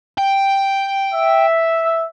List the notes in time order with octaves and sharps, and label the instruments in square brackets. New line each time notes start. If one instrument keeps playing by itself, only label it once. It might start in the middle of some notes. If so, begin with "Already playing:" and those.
[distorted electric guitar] G5
[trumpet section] E5